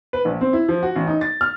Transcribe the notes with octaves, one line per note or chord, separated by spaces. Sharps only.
B4
A#1
C4
E4
F3
F#4
A1
D#4
A6
F6